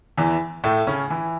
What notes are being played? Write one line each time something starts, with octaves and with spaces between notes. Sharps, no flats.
E2 E3
A2 A3
C#3 C#4
E3 E4